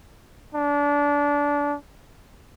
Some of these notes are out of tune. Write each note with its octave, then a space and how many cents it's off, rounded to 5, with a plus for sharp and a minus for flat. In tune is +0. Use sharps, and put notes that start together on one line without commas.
D4 -25